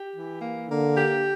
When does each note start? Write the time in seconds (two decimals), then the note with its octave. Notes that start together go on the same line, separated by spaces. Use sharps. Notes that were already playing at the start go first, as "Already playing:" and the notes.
Already playing: G4
0.13 E3
0.41 A#3
0.70 D3 A#3
0.97 G4